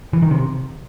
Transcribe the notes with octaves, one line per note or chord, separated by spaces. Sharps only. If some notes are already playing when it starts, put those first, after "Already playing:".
E3
D#3
C3